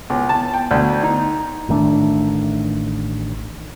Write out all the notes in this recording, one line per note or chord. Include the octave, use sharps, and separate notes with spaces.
C#2
A5
G5
D2
D#4
A1 D#3 A3 D4